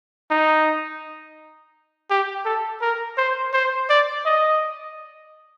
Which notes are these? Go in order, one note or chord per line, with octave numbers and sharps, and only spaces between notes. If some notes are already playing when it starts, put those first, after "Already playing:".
D#4
G4
A4
A#4
C5
C5
D5
D#5